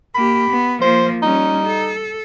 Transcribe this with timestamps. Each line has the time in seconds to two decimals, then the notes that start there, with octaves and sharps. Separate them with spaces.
0.15 A#3 G4 B5
0.49 B3
0.81 F3 A#3 C5
1.22 G3 C#4 D#4
1.66 A4